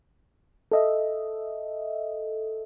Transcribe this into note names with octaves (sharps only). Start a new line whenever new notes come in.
A4 D#5 E5